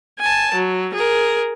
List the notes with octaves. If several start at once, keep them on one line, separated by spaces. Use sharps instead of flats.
G#5 A5
F#3
G#4 A#4